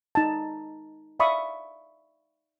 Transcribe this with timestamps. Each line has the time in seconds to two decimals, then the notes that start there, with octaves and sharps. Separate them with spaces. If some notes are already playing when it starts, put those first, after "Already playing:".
0.15 D#4 A5
1.20 D5 E5 F5 B5 C#6 D#6